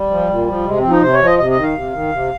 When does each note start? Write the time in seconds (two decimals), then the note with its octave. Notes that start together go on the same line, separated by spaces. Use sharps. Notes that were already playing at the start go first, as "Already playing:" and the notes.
Already playing: G3
0.10 F3
0.30 A#2
0.47 F3
0.65 C3 G#3
0.78 C4
0.84 F3
0.90 D#4
1.02 C3 C5
1.13 C#5
1.21 F3 D#5
1.38 C3 D#5
1.51 D#5
1.56 D#3
1.63 F5
1.75 C3
1.92 D#3
2.12 C3